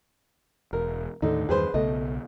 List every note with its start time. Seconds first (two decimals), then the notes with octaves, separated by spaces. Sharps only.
0.73 E1 A#4
1.22 D#2 A2 D3 D#3 D#4
1.49 E2 G2 D#3 G#4 B4 C5
1.74 B1 C#3 A3 B3 D#5